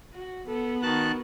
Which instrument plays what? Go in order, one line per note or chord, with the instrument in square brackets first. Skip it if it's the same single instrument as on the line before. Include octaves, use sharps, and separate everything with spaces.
[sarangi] F#4
[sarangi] B3 [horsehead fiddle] A4
[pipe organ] D#3 A5 F#6 [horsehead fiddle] F#4 A#4